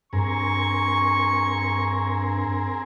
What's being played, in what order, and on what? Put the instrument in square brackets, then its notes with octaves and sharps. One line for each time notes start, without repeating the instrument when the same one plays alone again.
[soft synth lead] G2 [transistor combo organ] C4 G#4 A#4 [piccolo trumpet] C#6